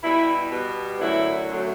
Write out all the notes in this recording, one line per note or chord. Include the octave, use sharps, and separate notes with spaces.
B2 G3 E4
B2 G3
F#2 D3 F#3 A3 E4
F#2 D3 F#3 A3